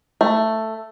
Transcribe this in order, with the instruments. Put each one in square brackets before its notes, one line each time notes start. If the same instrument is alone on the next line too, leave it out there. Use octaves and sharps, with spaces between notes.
[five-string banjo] A3